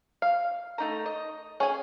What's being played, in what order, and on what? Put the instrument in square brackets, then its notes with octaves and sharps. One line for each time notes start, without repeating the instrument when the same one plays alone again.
[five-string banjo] F5
[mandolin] A3 D#4 A#5
D#5
[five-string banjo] C#4 G#5 [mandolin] G#4 C#6